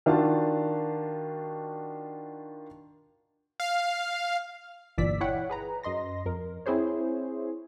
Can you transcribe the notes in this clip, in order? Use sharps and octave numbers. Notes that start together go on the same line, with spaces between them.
D#3 D4 F4 F#4 A5
F5
G1 A#2 E3 D5 E6 B6
E4 C#5 F#5 G5
G#4 B4 A#5
F#2 D#5 C6 A#6
F2 A#4
C4 E4 G#4 C5 C#5